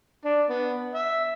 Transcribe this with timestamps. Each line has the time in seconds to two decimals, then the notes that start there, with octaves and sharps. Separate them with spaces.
0.25 D4
0.49 B3
0.94 E5